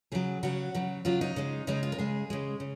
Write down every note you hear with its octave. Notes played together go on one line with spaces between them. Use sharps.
C#3 F#3 G#4
C#3 F#3 F#4
C#3 F#3
C#3 F#3 F4
D#4
C#3 G#3
C#3 G#3 D#4
F4
A#4
C#3 G#3 G#4
C#3 G#3
C#3